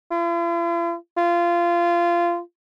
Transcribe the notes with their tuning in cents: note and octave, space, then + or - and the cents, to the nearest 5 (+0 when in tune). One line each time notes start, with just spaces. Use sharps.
F4 -45
F4 -20